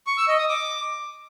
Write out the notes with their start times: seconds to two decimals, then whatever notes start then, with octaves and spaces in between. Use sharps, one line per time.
0.07 C#6
0.17 E6
0.28 D#5
0.39 D#6
0.49 D6